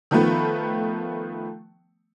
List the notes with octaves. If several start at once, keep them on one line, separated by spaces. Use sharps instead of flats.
D#3 F3 A3 B3